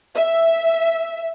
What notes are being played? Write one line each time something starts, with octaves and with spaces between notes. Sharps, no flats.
E5